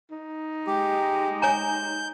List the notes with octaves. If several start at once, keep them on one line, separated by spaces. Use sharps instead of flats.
D#4
G#3 G4
C#5 G#5 A#5 G6